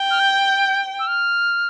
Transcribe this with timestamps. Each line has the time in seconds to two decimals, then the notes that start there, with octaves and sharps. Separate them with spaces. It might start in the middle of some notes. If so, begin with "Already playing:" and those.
Already playing: G5
0.11 F6
0.20 G6
0.99 E6
1.07 F6